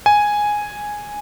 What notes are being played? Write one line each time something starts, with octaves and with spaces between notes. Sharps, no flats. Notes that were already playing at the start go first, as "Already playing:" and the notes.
G#5